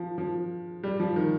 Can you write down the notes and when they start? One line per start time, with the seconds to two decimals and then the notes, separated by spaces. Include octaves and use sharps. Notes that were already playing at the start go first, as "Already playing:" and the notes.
Already playing: F3
0.18 F3
0.83 G3
1.00 F3
1.16 D#3